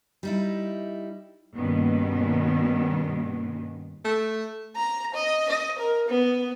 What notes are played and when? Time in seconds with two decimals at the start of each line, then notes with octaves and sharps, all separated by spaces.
0.23 G3 D#4 E4
1.57 G2 B2 D#3 A#3 B3 C#4
4.05 A3
4.75 A#5
5.14 D#5
5.49 D#5
5.78 A#4
6.08 B3